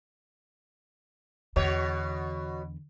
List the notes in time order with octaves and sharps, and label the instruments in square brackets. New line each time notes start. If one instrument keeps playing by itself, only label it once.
[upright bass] E2 D3 [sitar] B2 F#4 C#5